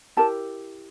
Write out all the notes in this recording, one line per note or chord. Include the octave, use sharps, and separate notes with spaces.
E4 G4 A#4 A5